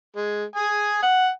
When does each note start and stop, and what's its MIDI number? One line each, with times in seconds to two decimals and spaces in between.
0.16 0.45 56
0.56 1.03 80
0.56 1.03 87
1.03 1.28 78